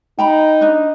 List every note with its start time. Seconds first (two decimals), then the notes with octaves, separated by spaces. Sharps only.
0.19 D#4 G5 A#5 B5
0.61 D4 D#5